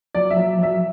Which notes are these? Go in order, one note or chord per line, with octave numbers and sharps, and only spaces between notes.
F#3 D5
E5
F#3
F#3 E5